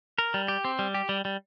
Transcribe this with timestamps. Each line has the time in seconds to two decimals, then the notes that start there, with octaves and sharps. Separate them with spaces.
0.18 A#4
0.34 G3
0.48 G4
0.65 C4
0.79 G3
0.94 G4
1.09 G3
1.25 G3